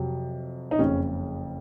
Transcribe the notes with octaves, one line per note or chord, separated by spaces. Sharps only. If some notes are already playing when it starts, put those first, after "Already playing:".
Already playing: F2 C3 F#3
D#4
F#1 F2 C#3 C#4